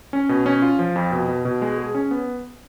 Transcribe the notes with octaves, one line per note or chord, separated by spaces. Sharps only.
C#4
B2
C#4
F4
F3
F2
B2
B2
B2
G#3
G#4
C#4
B3